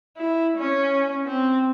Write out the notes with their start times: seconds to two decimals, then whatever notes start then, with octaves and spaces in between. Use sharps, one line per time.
0.17 E4
0.57 C#4
1.26 C4